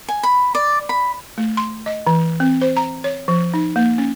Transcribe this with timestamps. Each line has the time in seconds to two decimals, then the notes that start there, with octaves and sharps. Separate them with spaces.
0.08 G#5
0.23 B5
0.55 D5
0.89 B5
1.38 A3
1.57 C6
1.86 D#5
2.07 E3
2.40 C4
2.62 C5
2.77 A#5
3.04 C#5
3.28 F3
3.54 D#4
3.76 A#3
3.98 C#4